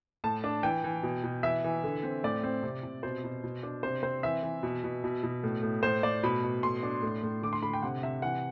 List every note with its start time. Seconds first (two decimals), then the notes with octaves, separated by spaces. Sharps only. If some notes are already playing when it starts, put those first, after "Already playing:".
0.24 A2 A5
0.44 D4
0.63 E3 G5
0.84 E3
1.03 B2
1.24 B2
1.43 E3 E5
1.64 E3
1.84 D3
2.03 C4
2.24 A2 D5
2.44 C4
2.63 C3
2.83 C3
3.03 B2 C5
3.24 B2
3.44 B2
3.63 D4
3.83 C3 C5
4.03 C4 C5
4.23 E3 E5
4.43 E3
4.63 B2
4.84 B2
5.04 B2
5.23 B2
5.44 A2
5.63 A2
5.83 A2 C5
6.03 A2 D5
6.23 B2 B5
6.44 B2
6.63 A2 C6
6.83 D4
7.02 A2
7.23 A2
7.43 D3 D6
7.53 C6
7.62 D3 B5
7.73 G5
7.82 C3 F#5
8.03 C3 E5
8.22 E3 F#5